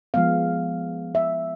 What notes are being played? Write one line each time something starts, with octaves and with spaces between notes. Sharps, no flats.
F3 G#3 B3 F5
E5